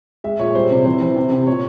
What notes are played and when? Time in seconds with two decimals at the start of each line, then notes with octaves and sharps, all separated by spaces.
0.24 G#3 E5
0.39 A#2 C#5
0.55 G3 C5
0.70 C3
0.85 E3 C5
1.01 E3
1.16 C3
1.32 C3
1.47 A#2 C#5